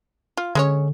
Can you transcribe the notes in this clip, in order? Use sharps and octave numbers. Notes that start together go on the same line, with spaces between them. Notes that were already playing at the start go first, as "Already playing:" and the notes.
F4
D3 G#3 C#4 C#5